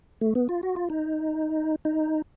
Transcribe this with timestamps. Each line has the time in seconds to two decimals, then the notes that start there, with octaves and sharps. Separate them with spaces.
0.21 A3
0.35 B3
0.49 F4
0.63 F#4
0.76 F4
0.90 D#4
1.85 D#4